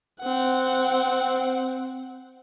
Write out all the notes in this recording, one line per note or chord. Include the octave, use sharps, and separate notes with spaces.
C4 F#5